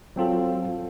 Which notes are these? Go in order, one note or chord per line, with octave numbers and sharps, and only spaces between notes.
F#3 C4 F4 A4